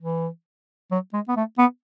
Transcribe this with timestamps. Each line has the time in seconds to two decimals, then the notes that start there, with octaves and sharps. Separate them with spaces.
0.01 E3
0.92 F#3
1.13 G#3
1.28 B3
1.36 A3
1.58 B3